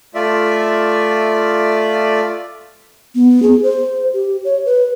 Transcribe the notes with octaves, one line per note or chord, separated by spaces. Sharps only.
A3 F4 D5 E5
B3
G#4
C5
G4
C#5
B4